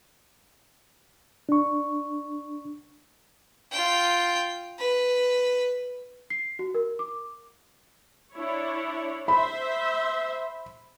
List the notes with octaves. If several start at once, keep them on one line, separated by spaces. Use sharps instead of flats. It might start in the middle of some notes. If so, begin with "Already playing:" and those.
D4 C#6
F4 G5
B4
C7
F#4
A#4
D6
D4 E4 C#5
C5 E5 B5